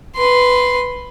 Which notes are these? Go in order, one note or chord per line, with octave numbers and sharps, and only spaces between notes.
B4 C6